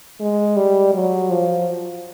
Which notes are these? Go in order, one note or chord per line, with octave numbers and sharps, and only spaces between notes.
G#3
G3
F#3
F3